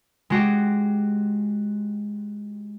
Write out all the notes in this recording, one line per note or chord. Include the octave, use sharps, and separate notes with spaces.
G#3 F#4 G4